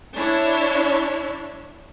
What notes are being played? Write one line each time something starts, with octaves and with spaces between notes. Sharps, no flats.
D4 E4 C#5